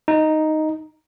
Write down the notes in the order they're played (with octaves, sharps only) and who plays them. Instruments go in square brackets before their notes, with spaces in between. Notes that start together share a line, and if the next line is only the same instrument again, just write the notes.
[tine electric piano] D#4